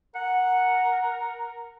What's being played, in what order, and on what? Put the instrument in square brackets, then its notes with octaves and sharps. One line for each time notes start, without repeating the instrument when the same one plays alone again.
[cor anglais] A#4 [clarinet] F#5